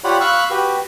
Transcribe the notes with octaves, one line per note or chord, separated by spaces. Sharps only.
F4 G4 C#5 D5 F#5 B5
F5 B5 C#6 E6 F#6
F#4 G4 B4